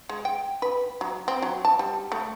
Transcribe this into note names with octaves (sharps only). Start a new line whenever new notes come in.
G#3
G5
B4
F#3
C4
F#3
A5
G3
A3